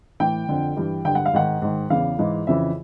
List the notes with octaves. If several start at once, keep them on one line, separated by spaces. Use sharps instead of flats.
A2 E3 G5
F2 D3
G2 E3
G2 D3 G5
F#5
F5
G#2 D#3 F#5
G#2 D#3
E2 C#3 E3 F5
G#2 E3
F2 C#3 E3 E5